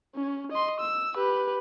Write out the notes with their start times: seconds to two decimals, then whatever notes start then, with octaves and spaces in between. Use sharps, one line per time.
0.15 C#4
0.52 D#5 C6
0.81 E6
1.15 G4 B4